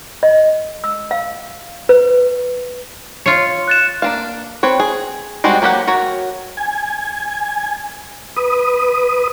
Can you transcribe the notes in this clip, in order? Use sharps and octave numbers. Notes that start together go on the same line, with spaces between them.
D#5
E6
F5
B4
F4 C#5 C#7
F#6 A6 E7
A#3 D4 F5
C4 B4 C#5
G#4
G3 G#3 C4 D4 F#4
F#3 A#3 G4 A#4 F#5
F#4 A#4 C#5
G#5
B4 D#6